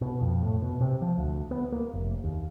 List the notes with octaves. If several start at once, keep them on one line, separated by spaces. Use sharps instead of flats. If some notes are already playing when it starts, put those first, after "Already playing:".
B2
F2
A2
B2
C3
F3
D2
B3
A#3
F1
D#2